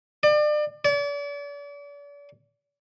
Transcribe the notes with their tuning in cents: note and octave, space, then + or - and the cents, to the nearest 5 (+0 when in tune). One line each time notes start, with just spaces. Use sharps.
D5 +35
D5 -40